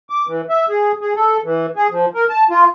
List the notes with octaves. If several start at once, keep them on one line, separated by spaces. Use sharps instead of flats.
D6
E3
E5
G#4
G#4
A4
E3
G#4
F3
A#4
A5
F4